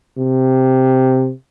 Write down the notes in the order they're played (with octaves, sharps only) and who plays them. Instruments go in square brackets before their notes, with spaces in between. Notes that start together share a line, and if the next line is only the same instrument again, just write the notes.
[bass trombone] C3